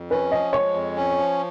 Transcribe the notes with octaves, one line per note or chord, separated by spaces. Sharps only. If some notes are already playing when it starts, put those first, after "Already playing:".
Already playing: F2
C#4 B4
F3 D#5
G#3 C#5
F2
C#4
F3